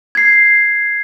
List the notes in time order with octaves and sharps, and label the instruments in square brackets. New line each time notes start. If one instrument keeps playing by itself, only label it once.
[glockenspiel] G#6 C7